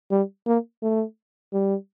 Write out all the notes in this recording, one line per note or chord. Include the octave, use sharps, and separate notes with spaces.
G3
A#3
A3
G3